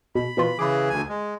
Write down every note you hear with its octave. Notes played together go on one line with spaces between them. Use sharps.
B2 B5
B2 E3 F4
C#3 E3 G#4 B5 D6
D2 G#5
G#3